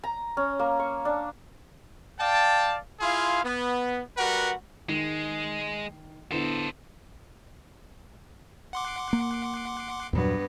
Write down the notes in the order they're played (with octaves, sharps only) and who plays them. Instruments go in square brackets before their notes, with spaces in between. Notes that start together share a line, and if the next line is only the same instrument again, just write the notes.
[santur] A#5
C#4
A#3
C#6
D4
[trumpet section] D5 F5 G5 A5
E4 F4 G#4 F5 C6
B3
G3 F#4 A#4 B4 F#5
[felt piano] D#3 C7 [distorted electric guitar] G#3
[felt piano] D3 B3 E4 [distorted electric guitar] A4 C5
[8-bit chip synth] F#5 C6 D6
[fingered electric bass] A#3
[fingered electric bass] E2 A#2 F#3 [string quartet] G2 B3